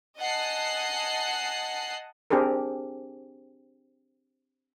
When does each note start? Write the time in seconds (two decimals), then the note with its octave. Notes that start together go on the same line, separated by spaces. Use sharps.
0.18 D#5 F#5 G#5 A5 F#6 C7
2.30 C4 D4 G4 G#4 A#4